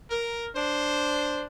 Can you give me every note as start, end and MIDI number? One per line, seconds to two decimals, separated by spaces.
0.11 0.47 70
0.56 1.43 62
0.56 1.43 72